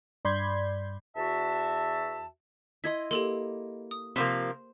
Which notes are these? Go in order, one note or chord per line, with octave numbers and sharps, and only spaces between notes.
G2 D5 B5 C6 G6 G#6
E2 F#4 E5 A5
E4 D#5 C6 G#6 B6
A#3 G4 A4 C6
D#6
C3 F3 A#3 C5 C6